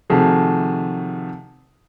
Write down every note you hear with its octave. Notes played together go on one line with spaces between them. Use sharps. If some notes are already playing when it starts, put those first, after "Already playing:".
C3 D#3 F3 A3 F#4 G#4